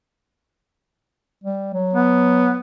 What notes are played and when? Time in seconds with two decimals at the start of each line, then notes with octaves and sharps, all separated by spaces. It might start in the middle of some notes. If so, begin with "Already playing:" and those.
1.44 G3
1.74 F#3
1.93 B3